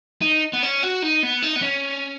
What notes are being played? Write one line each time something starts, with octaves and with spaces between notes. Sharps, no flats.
D#4
B3
C#4
F#4
D#4
B3
D#4
B3
C#4